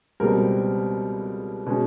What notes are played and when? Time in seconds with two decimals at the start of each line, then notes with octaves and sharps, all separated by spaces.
0.20 C#2 B2 G3 C4 A#4
1.66 B2 G#3 C#4 B4